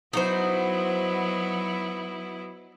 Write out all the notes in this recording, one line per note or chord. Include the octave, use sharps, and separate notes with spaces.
F#3 B3 D#4 E4 F#4 C5